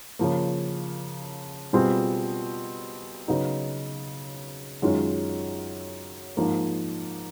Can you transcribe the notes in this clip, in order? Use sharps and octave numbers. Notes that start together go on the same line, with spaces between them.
C#3 F3 A#3
B2 G3 C4 F4 G#4
C#3 F#3 B3 D#4
F#2 D#3 G#3 C#4 F4
G#2 F3 A#3